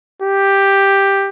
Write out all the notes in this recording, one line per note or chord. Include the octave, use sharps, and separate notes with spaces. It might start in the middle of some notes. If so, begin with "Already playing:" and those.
G4